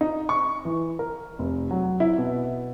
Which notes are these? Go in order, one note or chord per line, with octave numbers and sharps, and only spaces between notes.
D#4
C#6
E3
A#4
F1
F#3
E4
B2